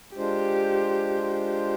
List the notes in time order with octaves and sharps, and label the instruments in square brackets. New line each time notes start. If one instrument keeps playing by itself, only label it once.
[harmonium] G#3 D4 F4 C5 [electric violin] G4
[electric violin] G4